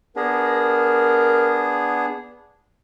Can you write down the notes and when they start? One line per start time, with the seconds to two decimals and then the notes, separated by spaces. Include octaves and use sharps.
0.16 B3 D4 G#4 A#4